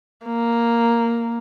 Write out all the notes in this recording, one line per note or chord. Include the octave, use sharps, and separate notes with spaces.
A#3